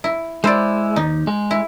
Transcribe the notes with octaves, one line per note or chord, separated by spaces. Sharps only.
E4
G#3 E4 C5 D5
D#2 D#4
G#3
E4